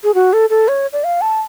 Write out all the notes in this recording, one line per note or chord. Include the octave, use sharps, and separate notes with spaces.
G#4
F#4
A4
A4
C#5
D5
F5
A5